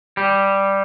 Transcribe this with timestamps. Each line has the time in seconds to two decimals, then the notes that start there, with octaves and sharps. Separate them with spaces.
0.17 G3